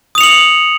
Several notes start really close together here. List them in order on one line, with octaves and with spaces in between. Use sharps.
D#6 F7 C#7 F#7